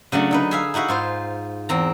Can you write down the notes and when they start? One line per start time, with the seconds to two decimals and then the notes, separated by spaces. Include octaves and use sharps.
0.12 C#3 F#3 A3 D4
0.31 D3 D#4 B4
0.51 G#4 E5 F5
0.74 D#4 E4 F#4 E5 F5
0.88 G#2 F4 C5
1.69 E2 C4 A#5